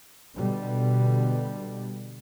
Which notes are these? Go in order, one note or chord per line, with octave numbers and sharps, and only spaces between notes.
B2 D3 G3